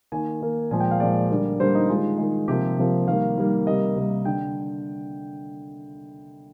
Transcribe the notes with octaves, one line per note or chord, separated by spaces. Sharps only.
D#3 A#3 G#5
D#3 A#3
A#2 F3 G#3 G#5
G5
F5
A#2 F3 G#3 D5
D3 G3 A#3
D3 G3 A#3 C5
D#4
D#3 G#3 F4
D#3 G#3
C3 F3 A#3 G4
C3 F3 A#3
D#3 G3 A#3 F5
D#3 G3 A#3
C3 G3 A#3 D#5
C3 G3 A#3
D3 G5